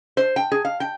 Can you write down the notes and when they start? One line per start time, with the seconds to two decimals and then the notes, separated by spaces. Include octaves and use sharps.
0.17 C5
0.36 G5
0.52 G#4
0.65 F5
0.80 G5